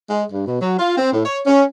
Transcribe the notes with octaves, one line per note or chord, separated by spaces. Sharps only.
G#3
G2
B2
F#3
F4
C4
A2
C#5
C#4